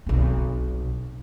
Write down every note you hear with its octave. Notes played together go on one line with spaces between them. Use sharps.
B1 C4